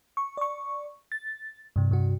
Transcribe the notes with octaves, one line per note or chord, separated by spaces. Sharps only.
C#6
D5 C#6
A6
G2 C3
G2 C3 F#4